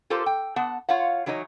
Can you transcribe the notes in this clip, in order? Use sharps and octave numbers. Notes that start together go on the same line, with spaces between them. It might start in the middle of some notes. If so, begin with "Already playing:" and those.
F4 G4 A4 A#4 C5
G5
B3 F#5 A5
F4 C#5 F5 F#5
E3 F#3 D#4 C#5 D#5